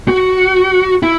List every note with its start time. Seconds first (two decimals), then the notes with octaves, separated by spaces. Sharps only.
0.08 F#4
1.03 E4